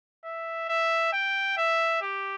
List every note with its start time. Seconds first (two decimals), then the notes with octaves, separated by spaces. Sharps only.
0.25 E5
0.69 E5
1.13 G5
1.58 E5
2.01 G4